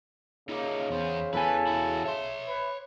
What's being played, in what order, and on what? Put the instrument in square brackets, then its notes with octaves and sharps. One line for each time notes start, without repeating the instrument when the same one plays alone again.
[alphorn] C#3 [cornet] A#3 [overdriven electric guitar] D#4 F4
[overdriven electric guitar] E2 B3 [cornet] C5
[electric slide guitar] E2 E3 G#5 [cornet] A4 [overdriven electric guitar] B4
[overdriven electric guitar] E4 F#4
[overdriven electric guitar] C#5 C6 [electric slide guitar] E5
[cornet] B4